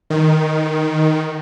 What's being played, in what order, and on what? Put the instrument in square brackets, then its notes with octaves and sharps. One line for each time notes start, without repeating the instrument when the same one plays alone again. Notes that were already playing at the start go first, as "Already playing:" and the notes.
[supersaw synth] D#3